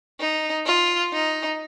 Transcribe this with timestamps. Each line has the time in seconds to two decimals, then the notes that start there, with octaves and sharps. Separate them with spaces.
0.20 D#4
0.66 F4
1.13 D#4